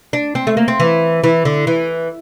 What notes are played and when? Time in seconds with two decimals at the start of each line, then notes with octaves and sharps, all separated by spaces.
0.13 D4
0.35 C4
0.47 A3
0.57 A#3
0.68 C4
0.80 E3
1.24 E3
1.45 D3
1.67 E3